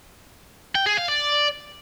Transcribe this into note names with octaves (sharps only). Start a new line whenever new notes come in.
G5
G#4
F5
D5